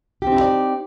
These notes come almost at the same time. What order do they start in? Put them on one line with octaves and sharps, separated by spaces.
G4 C4 D#4 E4 D5